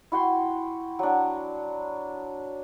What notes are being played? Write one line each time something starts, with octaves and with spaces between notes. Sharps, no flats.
E4 F#4 G5 C6
F#3 D4